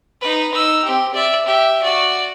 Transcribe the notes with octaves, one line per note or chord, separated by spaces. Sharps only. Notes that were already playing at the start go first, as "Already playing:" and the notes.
D#4 B4
D#4 E6
C4 G4
D5 E5
G4 E5
F#4 D5